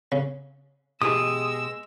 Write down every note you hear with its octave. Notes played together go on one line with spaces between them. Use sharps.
C#3
B2 G#3 G4 G#4 D#6 E6